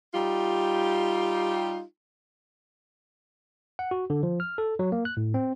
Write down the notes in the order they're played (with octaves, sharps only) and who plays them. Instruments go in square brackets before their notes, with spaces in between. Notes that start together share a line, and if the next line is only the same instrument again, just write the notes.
[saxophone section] G3 D#4 F4 G4
[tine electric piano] F#5
F#4
D3
F3
F6
A4
F#3
A#3
F#6
A2
C4